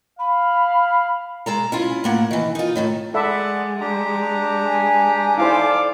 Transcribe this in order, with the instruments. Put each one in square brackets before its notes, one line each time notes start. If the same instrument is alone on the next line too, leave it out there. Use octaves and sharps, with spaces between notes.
[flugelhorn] F5 [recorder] B5
[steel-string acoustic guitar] G#3 A4 A#5
C#4 E4 F4
A2 A#3 F#5
D#3 E3
D#4 F4
A2 D#3 A3
[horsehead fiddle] G#3 [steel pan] A4 E5 B5 [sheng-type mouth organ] D5 F#5
[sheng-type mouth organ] D4 G4 A#5
[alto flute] G#5
[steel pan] D#4 E4 C5 [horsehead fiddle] A4 D5 [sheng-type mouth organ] F5 D6